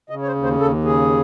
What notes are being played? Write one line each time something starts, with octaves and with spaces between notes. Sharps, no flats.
C#3 D#5
C#5
C5
D#2
C5
D#2 A4
C#3 G#4